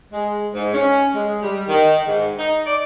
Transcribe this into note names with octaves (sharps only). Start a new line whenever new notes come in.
G#3
G#2
C#4
G#3
G3
D#3
G#2
D#4
D5